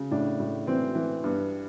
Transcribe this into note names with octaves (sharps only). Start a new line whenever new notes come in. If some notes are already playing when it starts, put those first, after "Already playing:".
Already playing: C#3
A2 D4
A2
E3 C4
E3
G2 B3